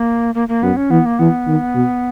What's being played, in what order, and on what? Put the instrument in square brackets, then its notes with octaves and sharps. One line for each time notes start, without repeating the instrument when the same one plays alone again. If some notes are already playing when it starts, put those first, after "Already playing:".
Already playing: [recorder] A#3
A#3
A#3
[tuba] F#2 [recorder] B3
[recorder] C#4
[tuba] E3 [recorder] B3
[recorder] A#3
[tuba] E3 [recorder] B3
[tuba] D#3
B2